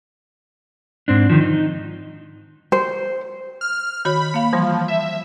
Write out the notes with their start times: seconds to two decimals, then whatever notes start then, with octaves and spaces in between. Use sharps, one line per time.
1.08 G#2 C4 D4
1.30 D#3 F3
1.41 D#4
2.72 C5
3.61 F6
4.05 D#3 F#4 C#5 B5
4.34 A#3 F5
4.53 E3 F3 G3
4.88 E5